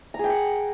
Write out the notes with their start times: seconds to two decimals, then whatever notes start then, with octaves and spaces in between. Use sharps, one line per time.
0.14 A#5
0.19 G#4
0.24 G5
0.29 F#5